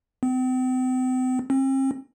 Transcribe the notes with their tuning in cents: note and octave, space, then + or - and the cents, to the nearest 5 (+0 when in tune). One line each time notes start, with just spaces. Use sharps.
C4 -40
C4 +40